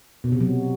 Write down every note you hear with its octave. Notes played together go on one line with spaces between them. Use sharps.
B2
C3
F#3